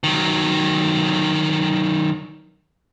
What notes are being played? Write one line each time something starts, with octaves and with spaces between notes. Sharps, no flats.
D#3 F#3